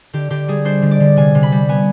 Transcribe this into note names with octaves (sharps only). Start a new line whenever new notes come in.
D3 G4
D3 G4
G3 G#4
D4 C5
D3
D5
D3
C3 G#5
C3
B5
G3
B3 G#5